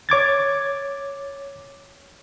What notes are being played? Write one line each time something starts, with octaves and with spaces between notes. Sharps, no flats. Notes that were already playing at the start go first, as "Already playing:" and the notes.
C#5 D6 G#6 A6